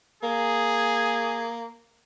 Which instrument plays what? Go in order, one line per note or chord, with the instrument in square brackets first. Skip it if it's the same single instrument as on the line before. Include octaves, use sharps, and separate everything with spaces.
[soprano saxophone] A#3 [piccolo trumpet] G#4